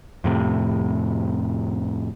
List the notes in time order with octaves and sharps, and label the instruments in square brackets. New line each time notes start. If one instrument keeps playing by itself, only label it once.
[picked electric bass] F2 A2 C3